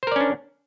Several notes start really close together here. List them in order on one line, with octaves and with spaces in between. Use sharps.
C5 A#4 D5 C#4 D4